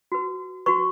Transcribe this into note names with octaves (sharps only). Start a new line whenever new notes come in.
F#4 B4
F#4 B4 C#6